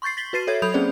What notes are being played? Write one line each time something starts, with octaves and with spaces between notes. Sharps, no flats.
C6 C#6 G6 A6 C7
A6 B6 F#7 G7
F#4 B4 A6 C7 D#7
A4 C#5 E5 G#6
F#3 A4 B5 D#6 G6 F7
A#3 C4 C#4 G#4 C5 D5